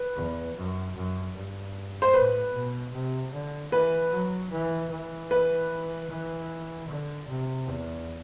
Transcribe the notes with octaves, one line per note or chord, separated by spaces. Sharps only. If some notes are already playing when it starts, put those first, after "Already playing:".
Already playing: B4
E2
F#2
F#2
G2
C5
A2 B4
B2
C3
D3
E3 B4
F#3
E3
E3
B4
E3
D3
C3
E2